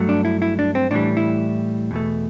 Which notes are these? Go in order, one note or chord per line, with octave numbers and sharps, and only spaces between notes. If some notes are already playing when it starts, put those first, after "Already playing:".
Already playing: G2 F#3 A3
D4
E4
E4
D4
C4
A2 E3 G3 D4
E4
E2 B2 A3